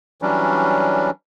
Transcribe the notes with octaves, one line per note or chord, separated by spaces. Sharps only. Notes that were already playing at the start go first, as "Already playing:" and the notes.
E3 F#3 G3 C#4 D4